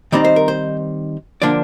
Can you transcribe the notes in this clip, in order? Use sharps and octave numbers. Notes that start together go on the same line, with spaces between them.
D#3 G3 C4 D#4 D5
C5
A#4
C5
D3 F3 A#3 D4 D5